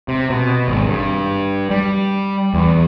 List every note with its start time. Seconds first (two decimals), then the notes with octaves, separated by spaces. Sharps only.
0.08 C3
0.30 B2
0.68 G#1
0.86 G2
1.70 G3
2.54 E2